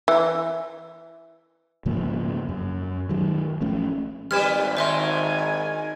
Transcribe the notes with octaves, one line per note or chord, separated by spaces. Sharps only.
E3
G#2 C#3 F3 A#3
F#2
D#3 F#3
A1 F3 A3 C#4
G#1 G3 B4 D5 F6 G#6 E7
D#3 C5 E5 G#5 C6